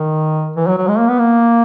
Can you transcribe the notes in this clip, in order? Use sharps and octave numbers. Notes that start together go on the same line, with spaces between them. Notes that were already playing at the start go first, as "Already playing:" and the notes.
Already playing: D#3
E3
F#3
F#3
G#3
A#3
B3
A#3